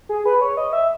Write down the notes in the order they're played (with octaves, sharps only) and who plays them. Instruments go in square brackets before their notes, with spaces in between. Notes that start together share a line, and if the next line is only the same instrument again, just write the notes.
[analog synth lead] G#4
B4
C#5
D#5
E5